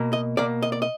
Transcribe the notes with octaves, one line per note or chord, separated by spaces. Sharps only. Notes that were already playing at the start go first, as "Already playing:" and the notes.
Already playing: B2 A#3
D#5
B2 A#3 D5
D#5
D5
D#5